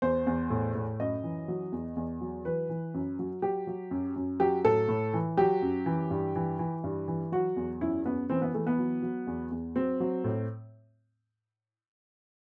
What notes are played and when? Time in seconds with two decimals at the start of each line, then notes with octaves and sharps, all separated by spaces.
0.02 E2 C5
0.27 E2
0.50 A2
0.75 A2
1.00 F#2 D#5
1.24 E3
1.48 F#3
1.72 E2
1.96 E2
2.21 F#3
2.45 E3 B4
2.69 E3
2.94 F#2
3.19 F#3
3.42 F#3 G4
3.67 F#3
3.91 F#2
4.16 F#2
4.40 F#3 G4
4.65 A2 A4
4.88 A2
5.13 E3
5.37 F#3 G4
5.62 F#2
5.86 E3
6.10 G2
6.36 E3
6.59 E3
6.84 G2
7.08 E3
7.32 F#3 F#4
7.56 E2
7.81 F#2 E4
8.05 F#2 B3
8.30 E3 C4
8.42 B3
8.54 E3 A3
8.67 B3
8.78 F#3
9.02 F#3
9.27 E2
9.51 E2
9.76 F#3 C4
10.00 F#3
10.24 A2